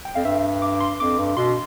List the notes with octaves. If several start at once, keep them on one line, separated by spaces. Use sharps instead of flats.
G5
F2 F5
G2 E5
D6
C6
F2 D6
G2
B2 C6